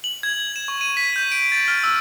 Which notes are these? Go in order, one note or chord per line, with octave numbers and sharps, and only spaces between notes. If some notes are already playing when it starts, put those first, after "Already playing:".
F#7
G#6
E7
C#6
D#7
B6
G6
D7
A6
F6
E6